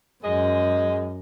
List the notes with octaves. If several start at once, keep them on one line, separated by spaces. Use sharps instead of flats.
F#2 G#3 D#5